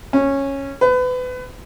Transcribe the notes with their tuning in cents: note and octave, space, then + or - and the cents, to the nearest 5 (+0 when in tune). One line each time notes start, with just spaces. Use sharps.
C#4 -10
B4 +30